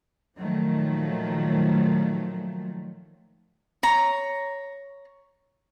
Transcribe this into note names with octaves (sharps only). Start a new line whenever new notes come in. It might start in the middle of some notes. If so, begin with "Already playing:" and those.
A#2 D#3 F3 F#3 A3
C#5 A#5